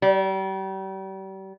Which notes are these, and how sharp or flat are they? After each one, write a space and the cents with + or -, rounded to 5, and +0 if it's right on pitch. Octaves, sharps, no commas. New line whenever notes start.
G3 -35